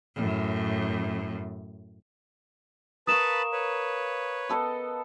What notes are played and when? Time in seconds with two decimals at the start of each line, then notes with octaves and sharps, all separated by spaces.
0.16 F#2 A2
3.07 A#4 B4 F5 A5 B5 C#6 D#6 E7
3.52 B4 C#5
4.49 B3 A4 D#5